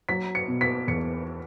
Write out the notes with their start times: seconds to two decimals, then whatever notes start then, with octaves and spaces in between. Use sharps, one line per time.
0.09 F#3 B6
0.35 C#7
0.48 B2
0.61 B6
0.88 E2 C#7